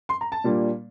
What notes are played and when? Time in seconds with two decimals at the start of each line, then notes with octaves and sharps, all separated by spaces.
0.09 C6
0.21 A#5
0.32 A5
0.44 A#2 G3 A#3 D4